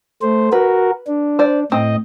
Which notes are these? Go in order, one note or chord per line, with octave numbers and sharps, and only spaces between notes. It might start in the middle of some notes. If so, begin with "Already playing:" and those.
A3 C5
F#4 A#4 B4
D4
C5 D5
A2 C4 D#5